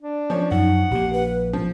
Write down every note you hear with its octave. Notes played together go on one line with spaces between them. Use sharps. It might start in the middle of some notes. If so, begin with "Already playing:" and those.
D4
F3 C#4 C#5
F#2 D#4 F#5
A#1 A#3 G4
B4
F3